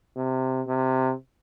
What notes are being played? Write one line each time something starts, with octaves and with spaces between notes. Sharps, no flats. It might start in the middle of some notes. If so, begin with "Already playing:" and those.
C3
C3